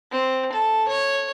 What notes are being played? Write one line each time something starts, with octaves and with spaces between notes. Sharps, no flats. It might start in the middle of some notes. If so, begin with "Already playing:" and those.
C4
A4
C#5